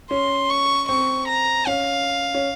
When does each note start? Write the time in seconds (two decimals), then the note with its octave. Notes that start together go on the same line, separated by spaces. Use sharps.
0.11 C#4 C6
0.50 C#6
0.89 C4 C#6
1.28 A#5
1.67 C#4 F5
2.34 C#4